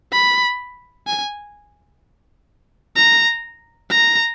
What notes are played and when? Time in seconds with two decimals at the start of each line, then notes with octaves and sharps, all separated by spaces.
0.12 B5
1.07 G#5
2.96 A#5
3.90 A#5